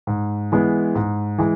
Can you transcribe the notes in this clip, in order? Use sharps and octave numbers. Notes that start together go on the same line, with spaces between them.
G#2
E3 G#3 B3
G#2
E3 G#3